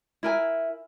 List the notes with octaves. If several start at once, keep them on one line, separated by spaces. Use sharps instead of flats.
E4 A#4 G#5